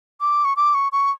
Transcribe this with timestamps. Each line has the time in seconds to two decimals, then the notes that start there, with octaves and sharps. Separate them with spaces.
0.21 D6
0.45 C#6
0.56 D6
0.74 C#6
0.92 C#6